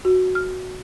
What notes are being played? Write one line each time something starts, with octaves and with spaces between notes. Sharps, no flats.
F#4
F6